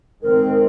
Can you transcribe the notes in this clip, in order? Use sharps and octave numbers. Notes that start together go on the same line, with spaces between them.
D#3 G#3 C4 A#4